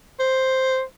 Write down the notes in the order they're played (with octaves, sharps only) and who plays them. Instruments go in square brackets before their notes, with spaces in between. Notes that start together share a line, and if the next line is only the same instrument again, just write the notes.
[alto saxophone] C5